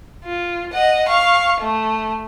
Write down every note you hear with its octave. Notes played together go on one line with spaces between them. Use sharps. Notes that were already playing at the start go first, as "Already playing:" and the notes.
F4
D#5 F#5
F5 C#6
A3